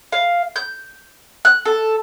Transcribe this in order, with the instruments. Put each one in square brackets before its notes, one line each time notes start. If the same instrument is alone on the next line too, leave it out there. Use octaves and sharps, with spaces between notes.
[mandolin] F5
G6
F#6
A4